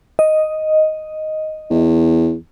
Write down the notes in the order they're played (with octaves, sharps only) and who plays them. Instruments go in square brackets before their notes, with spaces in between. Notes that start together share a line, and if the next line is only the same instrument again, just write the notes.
[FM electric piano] D#5
[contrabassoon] E2